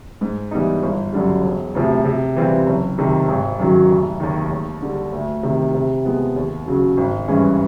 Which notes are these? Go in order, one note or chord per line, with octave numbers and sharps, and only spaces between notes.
G#2
E3 G3 B3 D#4
G1
F#2 D3 G3
E1
D2 C3 F3
C3
E3 G3 C4 F4
F#1
F2 C3 D#3
G#1
F#2 D#3 F#3
F1
D#2 D#3
D#2
D3 G3
D2
C3 D#3
C3
F3 G#3 B3
D#2
C#3 F#3
G#1
G2 E3 G#3 C#4